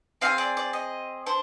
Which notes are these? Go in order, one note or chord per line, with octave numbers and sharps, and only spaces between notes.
C4 F4 G#4 F5
D5
D5
D#5
D4 C5